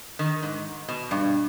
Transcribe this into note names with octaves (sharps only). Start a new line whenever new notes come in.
D#3
G#2
B2
G2